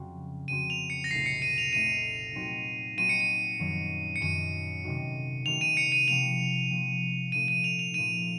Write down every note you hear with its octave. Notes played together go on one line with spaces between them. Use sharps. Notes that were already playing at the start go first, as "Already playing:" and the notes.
Already playing: F2 C#3 F#3 C4 F#4
F2 C#3 F#3 C4 F#4 D#7
F7
C#7
A#6
C2 A#2 A3 D#4 C7
C#7
D#7
F7
C2 A#2 A3 D#4 D#7
A#2 F#3 C4 D#4 F#4
A#2 F#3 C4 D#4 F#4 D#7
C#7
D#7
F#2 D#3 F#3
C#7
F#2 D#3 F#3 D#7
C3 D#3 A3 D#4 F#4
C3 D#3 A3 D#4 F#4 F7
D#7
C#7
D#7
C3 F3 A#3 F7
C3 F3 A#3
A#2 F3 A3 D#4 D#7
D#7
F7
F7
A#2 F3 A3 D#4 D#7